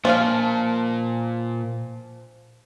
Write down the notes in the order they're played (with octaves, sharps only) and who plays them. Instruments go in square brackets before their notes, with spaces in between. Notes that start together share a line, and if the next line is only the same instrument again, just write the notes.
[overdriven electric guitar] A#2 [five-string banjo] F3 D4 F5